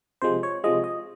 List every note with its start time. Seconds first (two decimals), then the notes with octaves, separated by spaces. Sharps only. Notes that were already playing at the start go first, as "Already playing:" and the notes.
0.22 C3 F3 G#3 C5
0.43 C#5
0.64 C3 F3 G#3 D#5
0.84 D#5